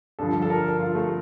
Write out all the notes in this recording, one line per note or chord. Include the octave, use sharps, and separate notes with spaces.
G2 D3 F3 A4
A4
A#4
A4
F4
A3